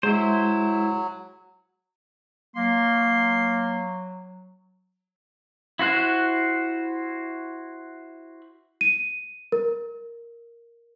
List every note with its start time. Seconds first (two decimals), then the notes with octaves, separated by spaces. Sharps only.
0.03 F#3 G#3 E4 G#4 C5
2.56 F#3 A#3 C6
5.79 E4 F#4 C5 F#6
8.81 D#7
9.52 A#4